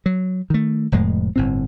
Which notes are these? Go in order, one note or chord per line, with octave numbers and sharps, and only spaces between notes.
F#3
D#3 A3
F1 F2 A2 G#3
G1 A2 C4